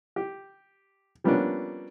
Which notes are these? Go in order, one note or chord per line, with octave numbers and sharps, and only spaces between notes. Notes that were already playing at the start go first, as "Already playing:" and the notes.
G4
F3 G3 A#3 B3 C#4 D4